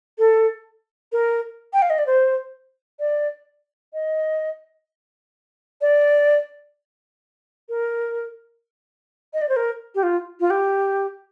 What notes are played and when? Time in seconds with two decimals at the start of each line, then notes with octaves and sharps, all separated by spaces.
0.19 A4
1.12 A#4
1.73 G5
1.82 F5
1.90 D#5
1.98 D5
2.07 C5
3.00 D5
3.93 D#5
5.81 D5
7.69 A#4
9.34 D#5
9.42 D5
9.49 C5
9.56 A#4
9.95 G4
10.03 F4
10.40 F4
10.50 G4